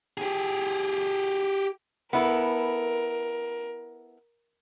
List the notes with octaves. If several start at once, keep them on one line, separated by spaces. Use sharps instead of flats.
G4 G#4
B3 E4 A4 A#4